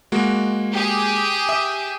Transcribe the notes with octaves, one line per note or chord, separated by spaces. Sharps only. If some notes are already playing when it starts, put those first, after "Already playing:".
G#3 A#3 F#4
G4 G#4
E5 D#6